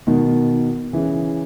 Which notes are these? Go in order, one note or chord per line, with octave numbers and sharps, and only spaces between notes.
B2 D#3
C#3 E3